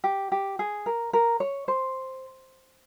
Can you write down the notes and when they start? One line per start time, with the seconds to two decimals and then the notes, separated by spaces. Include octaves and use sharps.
0.04 G4
0.32 G4
0.59 G#4
0.86 A#4
1.13 A#4
1.40 C#5
1.68 C5